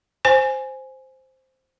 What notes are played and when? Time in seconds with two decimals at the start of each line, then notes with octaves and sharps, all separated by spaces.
0.25 C5 G#5